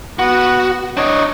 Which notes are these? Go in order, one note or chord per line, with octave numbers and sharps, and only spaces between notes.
B3 F#4
D4 C#5 D#5